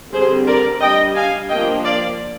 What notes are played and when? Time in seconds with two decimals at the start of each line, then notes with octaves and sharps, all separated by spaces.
0.13 D3 G3 C4 G#4 C5
0.47 A#4 D5
0.81 G3 D4 D#5 G5
1.15 F5 G#5
1.49 F3 A#3 D4 D#5 G5
1.84 D5 F5